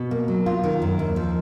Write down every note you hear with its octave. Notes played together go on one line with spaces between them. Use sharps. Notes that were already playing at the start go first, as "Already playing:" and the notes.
Already playing: B2
A#3
F#3
F4
D#3
F#2
D#2
F3